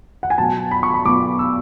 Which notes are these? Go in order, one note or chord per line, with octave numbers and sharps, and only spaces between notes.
F#5
G#5
B2 F#3 B3 A5
B5
C#6
B5
B2 F#3 B3 D6
E6